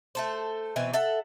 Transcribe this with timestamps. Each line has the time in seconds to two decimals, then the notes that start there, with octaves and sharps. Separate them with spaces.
0.15 A3 A4 C5
0.76 B2 E3 C4
0.93 A4 E5 F#5